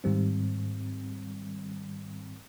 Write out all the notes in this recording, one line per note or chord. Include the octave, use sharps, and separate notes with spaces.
G#2 D#3 G3 C4